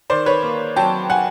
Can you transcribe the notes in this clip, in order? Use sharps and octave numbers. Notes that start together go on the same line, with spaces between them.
D#3 C5 D5
B4 C#5
A#3
F#3 G5 A5
F#5 G#5